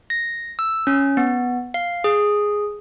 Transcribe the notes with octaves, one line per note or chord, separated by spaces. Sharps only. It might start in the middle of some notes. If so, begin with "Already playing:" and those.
A#6
E6
C#4
B3
F5
G#4